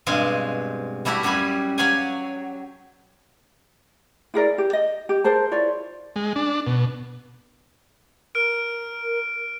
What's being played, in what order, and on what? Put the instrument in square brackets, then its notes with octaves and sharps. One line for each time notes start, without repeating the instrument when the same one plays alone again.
[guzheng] G2 B2 G#3 C4 F5 G#5
G3 A3 E4 F#4 G4
F#2 G3 F#4 G4 G#5 B5
F#3 G4 C#5 F5 F#5 G#5
[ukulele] E4 G#4 A#4 D5
G4
D#5
G4
G#4 A#4 C5 A5
E4 F4 C#5 D5
[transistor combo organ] G#3
D4
B2
[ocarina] A#4 [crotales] F6 D7